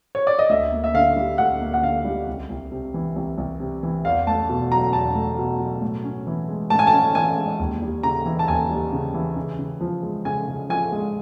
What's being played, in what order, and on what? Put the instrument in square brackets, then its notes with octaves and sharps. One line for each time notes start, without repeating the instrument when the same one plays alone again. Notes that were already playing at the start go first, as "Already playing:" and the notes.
[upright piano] C#5
D5
D#5
[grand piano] D2 [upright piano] E5
[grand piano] A#3
[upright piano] E5
[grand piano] D3 [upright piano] F5
[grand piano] G3
[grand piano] D2 [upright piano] F#5
[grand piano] A#3
[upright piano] F#5
[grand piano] D3 [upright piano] F5
[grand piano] G3
C2
C2
C3
E3
C2
C2
C3
E3
[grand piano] E2 [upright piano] F5
[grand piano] A3 [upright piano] A5
[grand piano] B2
[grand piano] F#3 [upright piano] A#5
[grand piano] E2 [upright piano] A5
[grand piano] A3
B2
F#3
A2
C#4
E3
G#3
[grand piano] A2 [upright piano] A5
[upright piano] G#5
A5
[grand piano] C#4
[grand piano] E3 [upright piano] G#5
[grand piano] G#3
D#2
G3
[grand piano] C#3 [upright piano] A#5
[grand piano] E3
[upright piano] A5
[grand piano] D#2 [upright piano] G#5
[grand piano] G3
C#3
E3
C#3
C#3
F3
G#3
[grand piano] C#3 [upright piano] G#5
[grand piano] C#3
[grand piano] F3 [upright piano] G#5
[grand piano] G#3